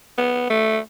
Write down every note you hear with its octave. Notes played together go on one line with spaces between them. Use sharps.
B3
A3